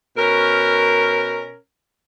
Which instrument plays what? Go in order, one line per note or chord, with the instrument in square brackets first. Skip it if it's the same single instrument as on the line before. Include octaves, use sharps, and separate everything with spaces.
[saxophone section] B2 C#4 A#4